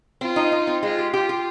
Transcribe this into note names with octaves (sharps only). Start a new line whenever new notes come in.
C4 F4
D#4
D#4
C4
G#3 F4
G4
F4 G4
G4